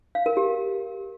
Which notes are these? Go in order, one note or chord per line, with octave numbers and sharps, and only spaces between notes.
F5
A#4
G4